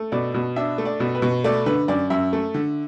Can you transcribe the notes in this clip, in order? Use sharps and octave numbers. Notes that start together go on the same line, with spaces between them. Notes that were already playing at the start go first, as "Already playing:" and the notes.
Already playing: A3
B2 D5
B2
D4 E5
A3
D5
B2
B4
B2
A3 D5
D3 B4
F#2 D5
F#2 E5
A3
D3